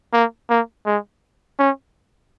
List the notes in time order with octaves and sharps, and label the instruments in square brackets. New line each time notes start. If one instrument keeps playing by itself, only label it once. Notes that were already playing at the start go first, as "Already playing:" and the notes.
[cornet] A#3
A#3
G#3
C#4